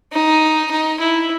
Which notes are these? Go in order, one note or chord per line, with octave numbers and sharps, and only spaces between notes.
D#4
D#4
E4